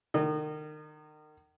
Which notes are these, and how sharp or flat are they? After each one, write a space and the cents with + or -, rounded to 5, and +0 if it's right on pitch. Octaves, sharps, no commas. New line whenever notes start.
D#3 -30 D#5 -35